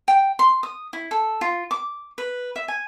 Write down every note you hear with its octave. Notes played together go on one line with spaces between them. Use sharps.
G5
C6
D#6
E4
A4
F4
D6
B4
E5
G#5